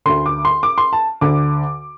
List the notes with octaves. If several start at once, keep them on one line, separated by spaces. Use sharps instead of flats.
D2 D3 C6
D6
C6
D6
C6
A5
D2 D3 D6